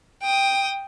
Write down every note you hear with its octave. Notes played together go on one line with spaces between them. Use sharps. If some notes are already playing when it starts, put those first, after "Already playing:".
G5 D#6